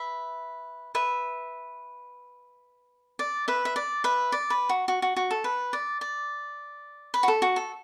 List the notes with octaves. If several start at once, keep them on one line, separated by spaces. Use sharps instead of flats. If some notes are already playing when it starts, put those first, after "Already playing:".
Already playing: B4 E5
B4 E5
D5
B4 E5
E5
D5
B4 E5
D5
B4
F#4
F#4
F#4
F#4
A4
B4
D5
D5
B4
F#4
A4
F#4
A4